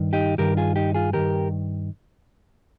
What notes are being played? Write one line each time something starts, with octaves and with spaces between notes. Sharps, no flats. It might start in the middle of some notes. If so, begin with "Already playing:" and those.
Already playing: G2 D#3
D#4 G4
G2 D#3 G4 A#4
F4 G#4
D#4 G4
F4 G#4
G2 D#3 G4 A#4